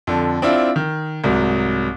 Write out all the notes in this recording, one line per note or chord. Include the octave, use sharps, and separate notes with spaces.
F2 D3
C4 D4 E4 F4
D#3
C2 G#2 F#3